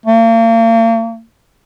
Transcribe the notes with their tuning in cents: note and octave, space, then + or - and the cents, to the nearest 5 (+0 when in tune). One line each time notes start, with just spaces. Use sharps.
A#3 -40